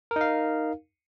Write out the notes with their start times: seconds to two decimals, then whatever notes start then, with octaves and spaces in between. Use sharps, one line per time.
0.11 A#4
0.16 D#4
0.21 F5